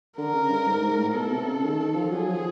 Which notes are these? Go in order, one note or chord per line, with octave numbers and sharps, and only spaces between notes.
D3 A#4
C#3
G2
G#2
G#2
A2
B2 A4
C3
C#3
D#3
D#3
F3
F#3 G#4
F3